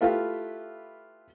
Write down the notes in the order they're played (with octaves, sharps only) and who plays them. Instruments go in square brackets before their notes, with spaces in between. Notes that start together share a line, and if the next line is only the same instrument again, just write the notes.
[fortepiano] A3 E4 F4 G4 B4 F5